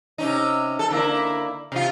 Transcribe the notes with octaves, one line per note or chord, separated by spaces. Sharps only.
C3 C#4 D#4
A4
D3 A#3 E4
C3 F4